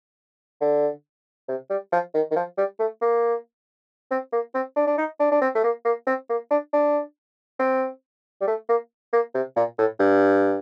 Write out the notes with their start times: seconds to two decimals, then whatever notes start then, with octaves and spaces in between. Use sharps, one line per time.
0.61 D3
1.48 C3
1.70 G3
1.92 F3
2.14 D#3
2.31 D#3
2.36 F3
2.58 G3
2.79 A3
3.01 A#3
4.11 C4
4.32 A#3
4.54 C4
4.76 D4
4.87 D4
4.98 D#4
5.20 D4
5.31 D4
5.41 C4
5.55 A3
5.64 A#3
5.85 A#3
6.07 C4
6.29 A#3
6.50 D4
6.73 D4
7.59 C4
8.41 G3
8.47 A3
8.69 A#3
9.13 A#3
9.35 C3
9.56 A#2
9.78 A2
10.00 G2